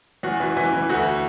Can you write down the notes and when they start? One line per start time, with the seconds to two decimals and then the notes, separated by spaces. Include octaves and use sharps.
0.23 E2 F#4
0.40 E3
0.57 E3
0.73 E3
0.89 D2 F#4